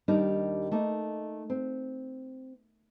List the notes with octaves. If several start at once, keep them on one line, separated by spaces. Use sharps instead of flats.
D#2 G3 D4 D#4 A#4
A3 A#3 D#4
C4